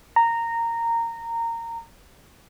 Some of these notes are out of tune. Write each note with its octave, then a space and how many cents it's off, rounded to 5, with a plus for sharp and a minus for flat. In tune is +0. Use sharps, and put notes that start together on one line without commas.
A#5 -15